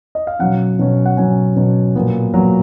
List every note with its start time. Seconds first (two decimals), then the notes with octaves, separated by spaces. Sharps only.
0.15 D#5
0.27 F5
0.39 B2 F#3 C#4 F#5
0.79 B2 F#3 C#4
1.06 F#5
1.17 B2 F#3 C#4 G#5
1.56 B2 F#3 C#4
1.96 A#2 F#3 B3
2.34 A#2 F#3 B3